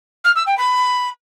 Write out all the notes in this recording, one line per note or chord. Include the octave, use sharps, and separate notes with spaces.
F6
E6
G5
B5